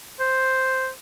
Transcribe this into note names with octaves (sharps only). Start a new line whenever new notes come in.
C5